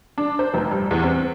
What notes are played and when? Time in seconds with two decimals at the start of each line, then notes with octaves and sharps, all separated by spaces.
0.18 D4
0.39 C5
0.54 F1
0.71 G2
0.91 E2
1.04 C4